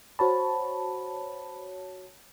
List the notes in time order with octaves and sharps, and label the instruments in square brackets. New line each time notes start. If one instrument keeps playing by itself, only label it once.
[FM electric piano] F#4 C#5 A5 [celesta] C5 B5